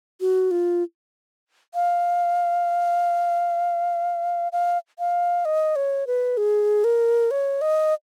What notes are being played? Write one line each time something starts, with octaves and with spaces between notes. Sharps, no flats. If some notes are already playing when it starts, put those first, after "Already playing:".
F#4
F4
F5
F5
F5
D#5
C#5
B4
G#4
A#4
C#5
D#5